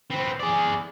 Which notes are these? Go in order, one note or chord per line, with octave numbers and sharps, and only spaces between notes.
B3 C4
G#4 D5